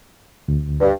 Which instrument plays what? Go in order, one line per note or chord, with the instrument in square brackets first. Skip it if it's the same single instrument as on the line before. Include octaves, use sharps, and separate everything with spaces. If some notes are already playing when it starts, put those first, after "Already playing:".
[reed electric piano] D2
[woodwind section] G2